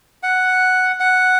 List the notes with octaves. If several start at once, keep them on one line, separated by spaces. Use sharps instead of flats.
F#5
F#5